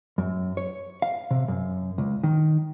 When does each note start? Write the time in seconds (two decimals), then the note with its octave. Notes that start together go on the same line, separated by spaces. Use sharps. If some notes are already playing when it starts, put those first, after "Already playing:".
0.18 F#2
0.57 C#5
1.02 F5
1.31 C3
1.48 F#2
1.98 C#2
2.24 D#3